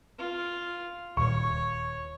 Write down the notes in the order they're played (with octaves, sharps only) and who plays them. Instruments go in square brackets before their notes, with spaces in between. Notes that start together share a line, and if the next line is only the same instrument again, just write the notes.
[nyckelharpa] F4
[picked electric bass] D#1 [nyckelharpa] C#5 [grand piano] C#6